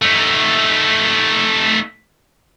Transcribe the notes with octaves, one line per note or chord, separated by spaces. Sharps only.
A3 D#4